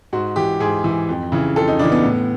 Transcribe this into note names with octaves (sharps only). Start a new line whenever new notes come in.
G#2 F#4
E3 G4
G#2 G#4
E3
F2
C#3 E3
F2 A4
D#4
C#3 E3 D4
B3
A2